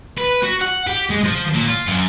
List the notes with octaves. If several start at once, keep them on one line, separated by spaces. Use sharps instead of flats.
B4
F#4
F#5
G4
G#3
F3
A#2
F4
F#2